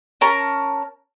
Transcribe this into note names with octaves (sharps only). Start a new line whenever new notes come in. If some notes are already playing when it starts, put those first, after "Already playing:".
C#4 A#4 A5 A#5